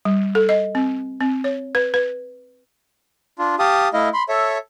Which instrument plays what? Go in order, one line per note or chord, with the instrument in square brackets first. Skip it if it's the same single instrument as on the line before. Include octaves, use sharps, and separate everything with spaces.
[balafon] G3
A4
D#5
C4
C4
C#5
B4
B4
[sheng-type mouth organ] D4 F4
G4 F5 A5 D#6
A3 E4 D#5 F5
B5 C6
A4 C#5 E5